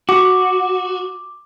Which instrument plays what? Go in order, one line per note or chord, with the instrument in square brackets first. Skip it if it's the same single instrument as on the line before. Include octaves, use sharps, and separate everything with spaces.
[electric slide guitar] F#4 [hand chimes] D6